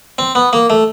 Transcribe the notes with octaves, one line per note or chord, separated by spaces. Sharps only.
C4
B3
A#3
A3